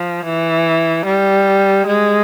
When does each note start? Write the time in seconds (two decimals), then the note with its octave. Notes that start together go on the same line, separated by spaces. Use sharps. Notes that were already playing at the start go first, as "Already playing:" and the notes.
Already playing: F3
0.25 E3
1.06 G3
1.87 G#3